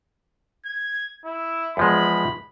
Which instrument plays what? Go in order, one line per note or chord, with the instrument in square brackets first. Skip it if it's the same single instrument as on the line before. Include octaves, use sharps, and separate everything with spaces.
[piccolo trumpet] G#6
E4
[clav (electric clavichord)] E2 F3 G#3 [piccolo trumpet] B5